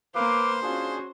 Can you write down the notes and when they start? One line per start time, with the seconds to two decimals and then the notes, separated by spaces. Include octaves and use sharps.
0.15 A#3 B4 C5 F5 D6
0.62 C#4 D4 F4 F#4 G#4